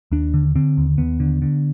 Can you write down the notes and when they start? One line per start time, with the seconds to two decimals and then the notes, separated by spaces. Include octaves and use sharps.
0.12 D#2 D4
0.34 D3
0.55 D3 C4
0.78 D#2
0.98 D#2 B3
1.20 D3
1.42 D3